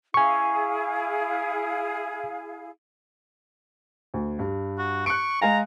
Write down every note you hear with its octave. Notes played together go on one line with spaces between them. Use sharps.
E4 G#4 F5 G#5 C#6
D2
G2
F#4
C#6 F#6 C#7 D7
G#3 F5 G#5 A#5